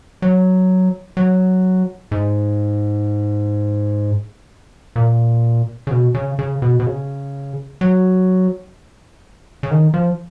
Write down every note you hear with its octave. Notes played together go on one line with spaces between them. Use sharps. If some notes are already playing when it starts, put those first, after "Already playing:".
F#3
F#3
G#2
A#2
C#3
B2
C#3
C#3
B2
B2
C#3
F#3
C#3
D#3
F3